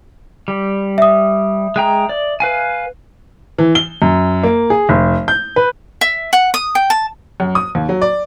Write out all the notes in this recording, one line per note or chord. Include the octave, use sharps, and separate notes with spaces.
G3
E5 D#6
G#3 G5 A#5
D5
B4 F5 G#5
E3
G7
F#2
A#3
G#4
F1
G6
B4
E5
F#5
D#6
G5
A5
F#2
D#6
D#2
F#3
D5